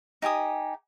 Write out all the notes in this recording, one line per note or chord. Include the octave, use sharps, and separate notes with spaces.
D#4 G4 G#5 D#6